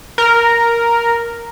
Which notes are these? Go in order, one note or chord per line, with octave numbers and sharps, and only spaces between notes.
A#4